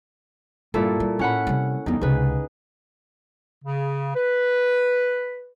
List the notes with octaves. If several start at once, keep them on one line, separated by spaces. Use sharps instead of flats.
G2 A#2 E4 A4
G3
A2 C#4 F#5 B5
C3 G3
E2 G2 D#4
C#2 C3 G#4 B4
C#3
B4